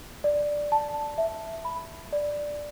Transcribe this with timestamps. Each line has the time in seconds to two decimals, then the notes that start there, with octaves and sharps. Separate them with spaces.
0.24 D5
0.72 A5
1.18 E5
1.65 B5
2.13 D5